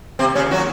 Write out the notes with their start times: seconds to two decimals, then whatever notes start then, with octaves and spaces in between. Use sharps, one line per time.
0.19 C3 D#3 A#3 C4 F4
0.35 C#3 C#4
0.51 F#3 F#4